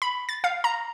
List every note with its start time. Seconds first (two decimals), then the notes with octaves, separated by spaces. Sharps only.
0.02 B5
0.29 A6
0.44 F5
0.64 A#5